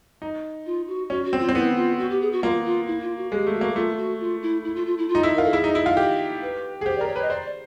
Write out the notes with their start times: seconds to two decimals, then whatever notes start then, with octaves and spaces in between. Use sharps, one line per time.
0.22 D#4
0.66 F4
0.88 F#4
1.10 C#4 F#4
1.25 F#4
1.33 C4
1.40 F4
1.49 C4
1.55 B3 E4
1.76 F4
1.99 F#4
2.10 G4
2.21 G#4
2.33 F#4
2.43 A#3 F4
2.65 F4
2.87 E4
3.02 F4
3.17 F#4
3.31 G#3 G4
3.47 A3
3.54 F#4
3.61 A#3
3.76 A3 F4
3.98 F#4
4.21 F4
4.42 E4
4.64 E4
4.75 F4
4.87 F4
4.98 E4
5.09 F4
5.15 D#4
5.23 E4
5.35 F4 A#4
5.44 A4
5.53 E4 G#4
5.64 D#4
5.75 E4
5.86 F4
5.97 G4
6.42 B4
6.81 G#4
6.85 G4 C5
6.97 A#4 D5
7.08 C#5
7.16 B4
7.22 D#5
7.30 C5 D5